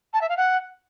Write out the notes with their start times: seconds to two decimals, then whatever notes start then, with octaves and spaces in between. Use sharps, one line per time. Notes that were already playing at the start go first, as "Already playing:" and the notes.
0.14 A5
0.21 E5
0.29 F5
0.37 F#5